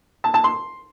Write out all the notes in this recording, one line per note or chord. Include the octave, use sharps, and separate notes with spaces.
A5
A5
C6